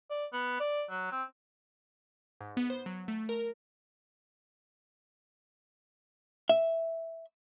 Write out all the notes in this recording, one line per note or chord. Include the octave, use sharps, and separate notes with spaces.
D5
B3
D5
F#3
C4
G#2
B3
C5
F#3
A3
A#4
E5